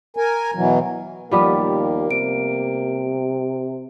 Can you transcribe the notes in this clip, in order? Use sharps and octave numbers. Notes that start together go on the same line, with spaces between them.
A#4 G#5
B2 E3 F#3
D#2 F3 G3 A#3 B3 G4 B5 D6
C3 D7